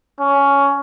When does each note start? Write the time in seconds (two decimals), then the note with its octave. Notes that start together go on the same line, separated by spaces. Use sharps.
0.20 C#4